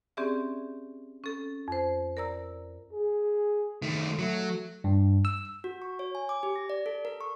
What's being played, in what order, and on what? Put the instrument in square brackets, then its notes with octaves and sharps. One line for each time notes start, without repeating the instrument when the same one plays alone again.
[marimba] C4 C#4 G4 G#4 D5 E5
C#4 A4
F2 C5
A#4 D5 A#5 E6
[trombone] G#4
[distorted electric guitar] D#3 A3
[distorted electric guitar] F#3 [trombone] A3
[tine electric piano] G2
E6
[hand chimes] F#4
C#6
C#5
G#5
D6
G4
A#6
D5
A4
A#4
C#6